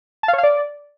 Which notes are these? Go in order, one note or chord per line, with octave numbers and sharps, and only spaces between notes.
A5
F5
C#5
F5
D5